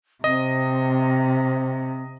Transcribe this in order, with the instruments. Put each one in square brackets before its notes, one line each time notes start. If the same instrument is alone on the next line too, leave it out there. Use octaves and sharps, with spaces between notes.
[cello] C3 [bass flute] C4 [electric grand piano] D#5